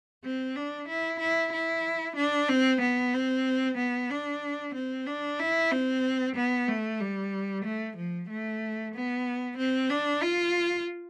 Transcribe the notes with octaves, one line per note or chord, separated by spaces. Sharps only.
C4
D4
E4
E4
E4
D4
C4
B3
C4
B3
D4
C4
D4
E4
C4
B3
A3
G3
A3
F3
A3
B3
C4
D4
F4